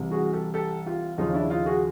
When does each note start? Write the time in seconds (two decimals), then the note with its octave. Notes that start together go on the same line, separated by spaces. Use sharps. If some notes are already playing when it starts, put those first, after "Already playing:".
Already playing: C2 C3 E3
0.11 F#4 G#4
0.33 G4 A4
0.54 G4 A4
0.86 F4 G4
1.18 D#2 C#3 F3 D#4 F4
1.34 D4 E4
1.50 D#4 F4
1.66 F#4 G#4